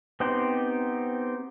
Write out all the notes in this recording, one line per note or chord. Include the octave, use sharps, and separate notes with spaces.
B3 C4 D#4 G4 C5